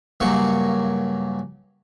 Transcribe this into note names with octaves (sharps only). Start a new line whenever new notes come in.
G2 C#3 F#3 A#3 C#6